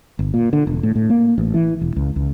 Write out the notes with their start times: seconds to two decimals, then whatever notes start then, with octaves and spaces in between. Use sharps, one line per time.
0.19 G1
0.34 A#2
0.53 D3
0.67 E1
0.83 A2
0.96 A2
1.10 A#3
1.38 A1
1.54 E3
1.81 E1
1.96 C#2
2.16 C#2